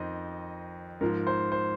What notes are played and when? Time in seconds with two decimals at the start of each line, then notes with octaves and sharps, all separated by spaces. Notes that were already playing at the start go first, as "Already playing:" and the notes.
Already playing: F2 D#3 D#4 C5 D#5
1.01 G#2 F3 A#4
1.27 C5
1.52 C5